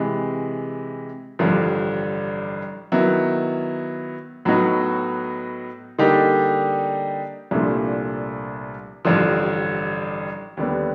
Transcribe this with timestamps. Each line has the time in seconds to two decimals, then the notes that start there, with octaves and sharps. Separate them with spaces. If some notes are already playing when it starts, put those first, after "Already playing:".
Already playing: C3 E3 G#3
1.39 A1 G2 D3 F3
2.92 D#3 F#3 B3 E4
4.45 A2 F#3 B3 D#4 F#4
5.99 D3 G3 A#3 D#4 G4
7.51 C2 A#2 F3 A3 D4
9.05 A1 G2 D3 F3
10.57 D#2 D3 G3 B3